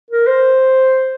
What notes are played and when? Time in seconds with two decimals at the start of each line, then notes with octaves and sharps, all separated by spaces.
0.10 A#4
0.27 C5